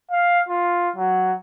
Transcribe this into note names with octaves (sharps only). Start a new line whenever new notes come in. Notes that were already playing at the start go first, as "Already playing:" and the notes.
F5
F4
F#3